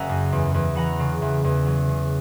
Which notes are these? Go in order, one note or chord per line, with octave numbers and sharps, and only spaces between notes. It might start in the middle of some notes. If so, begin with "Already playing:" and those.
Already playing: F#1 C#3 E5 F#5 G#5 A#5
F#2
E2
E2
E3 F#5 A#5
C#3
E2
E2
F#3
C#3